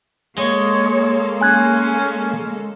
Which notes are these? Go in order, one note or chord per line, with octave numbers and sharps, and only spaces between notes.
G#3 A#3 A4 C#5
C#4 G#5 F#6 G#6